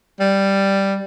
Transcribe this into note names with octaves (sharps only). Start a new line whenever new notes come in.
G3